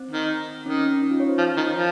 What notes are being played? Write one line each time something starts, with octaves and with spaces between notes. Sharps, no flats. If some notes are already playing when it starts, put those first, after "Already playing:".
Already playing: C4
D#3
D#3 C#4
C#4
C#4
D#4
F4
C#5
C5
F3
D#3
F3